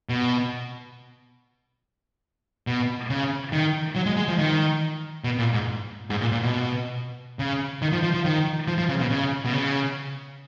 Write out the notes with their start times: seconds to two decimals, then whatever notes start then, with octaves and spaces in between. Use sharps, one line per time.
0.09 B2
2.67 B2
3.10 C#3
3.52 D#3
3.96 F#3
4.06 G#3
4.17 G#3
4.28 F3
4.38 D#3
5.24 B2
5.39 A#2
5.53 G#2
6.10 G#2
6.21 A#2
6.32 A#2
6.42 B2
7.39 C#3
7.82 D#3
7.92 F3
8.03 F3
8.14 F3
8.25 D#3
8.68 F3
8.78 F3
8.89 C#3
9.00 B2
9.10 C#3
9.45 B2
9.53 C#3